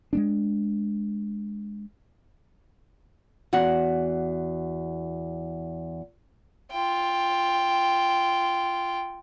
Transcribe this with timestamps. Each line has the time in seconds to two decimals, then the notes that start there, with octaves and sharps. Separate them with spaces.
0.13 G#3 B3 D4
3.53 E2 F#4 F#5
6.72 F4 G5